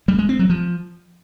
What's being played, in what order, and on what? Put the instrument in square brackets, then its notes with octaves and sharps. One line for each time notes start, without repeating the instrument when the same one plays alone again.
[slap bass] G3
G#3
C4
F#3
F3